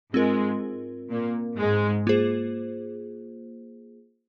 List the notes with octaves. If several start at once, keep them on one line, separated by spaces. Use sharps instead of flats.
G#2 G#3 C4 F4 A#4
A#2 A#3
G#2 G#3
A#3 F4 G#4 C5